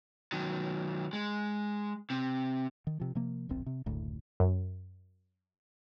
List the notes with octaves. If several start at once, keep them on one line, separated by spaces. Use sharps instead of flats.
D#3 F#3
G#3
C3
D#3
C3 F3
C3 F3 A#3
D1 A#1 C4
C3
F#1 D2 A2
F#2